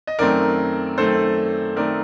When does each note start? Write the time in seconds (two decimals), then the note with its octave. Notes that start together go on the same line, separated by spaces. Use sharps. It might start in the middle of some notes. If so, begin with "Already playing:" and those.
0.07 D#5
0.19 F#2 D#3 A3 C4 A#4 D5
0.98 F#2 D#3 A3 C4 A4 C5
1.76 D#3 A3 C4 A#4 D5